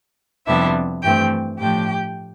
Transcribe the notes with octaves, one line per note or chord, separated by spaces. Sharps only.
F2 C3 G3 B3 D4 E4 E5
G2 E3 A3 C4 G4 G5
A2 F3 A3 D4 G4 G5